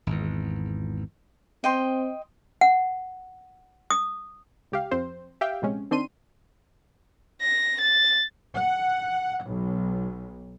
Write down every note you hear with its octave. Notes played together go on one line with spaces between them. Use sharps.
G#1 E2
C4 D#5 G5 C6
F#5
D#6
C#2 G4 F5
F2 C4 C5
G4 E5 F5 G5
A#1 C3 G#3 C#4
D#3 C4 D4 C6 D#7
A#6
A6
F#5
B1